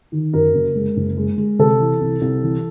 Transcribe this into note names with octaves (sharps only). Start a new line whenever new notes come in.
D#3
F#2 A#4
F#1
G#3
F#1
G#3
G#3
C3 A4
E3
C2
C2
E3